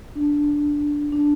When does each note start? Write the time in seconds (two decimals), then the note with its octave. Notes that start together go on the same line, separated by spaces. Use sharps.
0.15 D4
1.12 D4